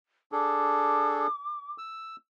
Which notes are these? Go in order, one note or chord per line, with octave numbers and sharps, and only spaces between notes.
D4 G#4 A4 D6
E6